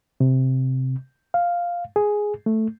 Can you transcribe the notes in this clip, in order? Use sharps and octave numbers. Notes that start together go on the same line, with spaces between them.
C3
F5
G#4
A3